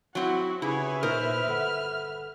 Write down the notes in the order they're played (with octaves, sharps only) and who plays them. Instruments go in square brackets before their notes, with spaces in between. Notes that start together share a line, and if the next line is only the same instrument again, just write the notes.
[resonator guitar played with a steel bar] F#3 C4 [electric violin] E4 F#4
[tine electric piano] C#3 G4 D6 [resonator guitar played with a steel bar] E4 [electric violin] G#4 C#5 [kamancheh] B4 E5
[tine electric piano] A#2 D#4 D#6 [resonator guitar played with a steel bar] A#4 C5 [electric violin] F6
[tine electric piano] G1 A4 F#5